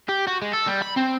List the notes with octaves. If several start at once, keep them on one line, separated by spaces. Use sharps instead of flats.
G4
F#4
G#3
A4
G3
B5
C4